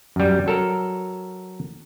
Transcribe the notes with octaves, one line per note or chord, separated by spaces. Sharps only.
F#2 G3
F#3 A4 A#4